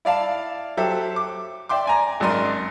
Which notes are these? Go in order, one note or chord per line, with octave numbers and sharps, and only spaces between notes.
E4 D5 F5 A5
F#3 G4 A4 C5 E5
D6
D5 E5 G5 C6 D6
D5 G#5 A#5
G#1 F#2 A#4 D5 D#5 C6